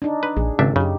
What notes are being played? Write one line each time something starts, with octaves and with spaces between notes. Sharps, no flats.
D4 D#4
B4
A#1 G#4
G#1 C#3 D4 E5
F#2 C#3 D#4 G4